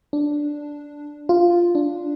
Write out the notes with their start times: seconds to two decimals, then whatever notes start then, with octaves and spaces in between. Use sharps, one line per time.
0.13 D4
1.29 F4
1.75 D4